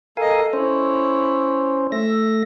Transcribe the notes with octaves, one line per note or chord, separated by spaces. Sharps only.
A4 A#4 D#5 F5 G#5
C#4 E4 C5 C#5
A3 E5 A#6